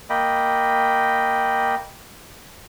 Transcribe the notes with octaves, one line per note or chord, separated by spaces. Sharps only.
A#3 D#5 G5 B5